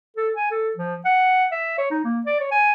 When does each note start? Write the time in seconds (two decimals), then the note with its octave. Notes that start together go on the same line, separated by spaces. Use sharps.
0.17 A4
0.36 G#5
0.51 A4
0.77 F3
1.05 F#5
1.52 E5
1.78 C#5
1.91 D#4
2.04 A#3
2.26 D5
2.40 C#5
2.51 G#5